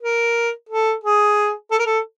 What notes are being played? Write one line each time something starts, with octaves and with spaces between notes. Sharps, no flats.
A#4
A4
G#4
A4
A#4
A4